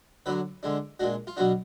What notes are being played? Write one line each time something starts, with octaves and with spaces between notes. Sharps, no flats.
D3 F#3 D4 B4
D3 G#3 D4
A#2 G#3 D4 F#4
F4
B2 F#3 B3 D4 F#4